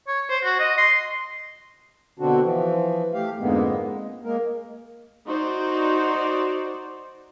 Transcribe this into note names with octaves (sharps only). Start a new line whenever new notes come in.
C#5
C5
F#4
D#5
C6
B2 D3 C4 D4 F#4
E3 F3
A3 G4 F5
F2 G#2 D3 G#3 A#3 B3
G#3
G#3 A#3 A#4
D#4 F#4 C5 D5